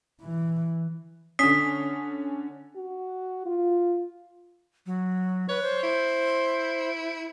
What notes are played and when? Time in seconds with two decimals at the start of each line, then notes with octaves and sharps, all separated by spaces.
0.22 E3
1.39 D3 C#4 D#6 B6 C7
2.76 F#4
3.46 F4
4.86 F#3
5.49 B4 C#5
5.62 C5
5.83 E4